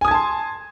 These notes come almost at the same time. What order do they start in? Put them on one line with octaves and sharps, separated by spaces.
G#5 D#6 G#6 A5 C6